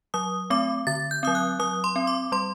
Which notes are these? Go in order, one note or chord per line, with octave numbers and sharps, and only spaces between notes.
F#3 D#6
A3 C4 D6
D3 A6
G6
F#3 C4 D#6
F#6
F#3 D#6
C6
C4
D6
G3 C6